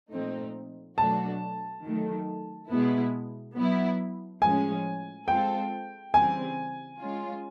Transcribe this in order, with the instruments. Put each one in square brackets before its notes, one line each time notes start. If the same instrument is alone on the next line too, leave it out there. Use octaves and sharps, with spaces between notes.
[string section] A#2 F3 A3 C4 D#4
[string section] B2 F#3 A3 D4 F#4 [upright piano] A5
[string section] D#3 F#3 A3
B2 G#3 B3 E4
F#3 B3 E4
[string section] A2 F3 G#3 C#4 [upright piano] G#5
[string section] G#3 C4 F4 A4 [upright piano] G5
[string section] C#3 E3 G3 C4 [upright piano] G#5
[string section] G#3 C#4 F4